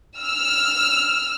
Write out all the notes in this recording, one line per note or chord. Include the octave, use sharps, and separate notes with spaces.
E6 F6